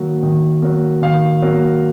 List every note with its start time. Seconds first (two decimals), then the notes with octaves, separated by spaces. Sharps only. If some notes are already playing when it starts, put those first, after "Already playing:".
Already playing: D#3 F#3 A#3
0.23 D#3
0.62 F#3 A#3
1.02 D#3 F5
1.42 F#3 A#3